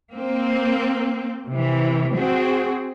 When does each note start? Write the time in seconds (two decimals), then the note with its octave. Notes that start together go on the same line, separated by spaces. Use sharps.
0.15 A#3 C4
1.51 C3 E3
2.16 C4 F#4 G#4